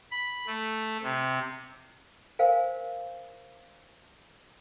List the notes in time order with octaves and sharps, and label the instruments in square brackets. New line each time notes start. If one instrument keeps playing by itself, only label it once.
[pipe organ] B5
A3
C3
[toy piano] A#4 C5 F5 G#5